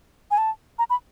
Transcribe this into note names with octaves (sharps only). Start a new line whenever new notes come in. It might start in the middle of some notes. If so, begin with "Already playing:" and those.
G#5
A5
A#5
B5